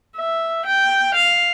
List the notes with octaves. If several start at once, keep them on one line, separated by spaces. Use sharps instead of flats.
E5
G5
F5